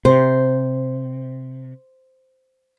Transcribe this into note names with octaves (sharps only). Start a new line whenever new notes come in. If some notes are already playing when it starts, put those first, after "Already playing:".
C3 C5